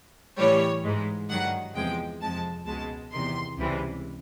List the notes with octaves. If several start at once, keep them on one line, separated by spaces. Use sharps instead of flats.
A2 E3 G3 C#5
G#2 E3 G#3
G2 D#3 F#3 F#5
E2 C3 F3 G#3 G5
F2 C3 F3 G#3 A5
C#2 B2 G#3 A5
E2 C3 D#3 C6
C#2 C3 E3 G3